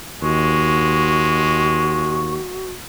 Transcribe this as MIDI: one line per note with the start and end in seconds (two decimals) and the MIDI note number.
0.22 2.37 39
0.22 2.20 56
0.22 2.71 66
0.22 2.33 85